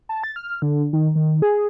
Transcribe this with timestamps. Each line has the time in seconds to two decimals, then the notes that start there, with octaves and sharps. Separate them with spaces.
0.09 A5
0.24 A6
0.36 F6
0.62 D3
0.93 D#3
1.15 D#3
1.42 G#4